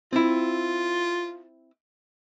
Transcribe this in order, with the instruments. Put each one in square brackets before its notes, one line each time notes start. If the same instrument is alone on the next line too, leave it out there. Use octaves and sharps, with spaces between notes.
[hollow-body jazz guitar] C4 E4 [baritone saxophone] F4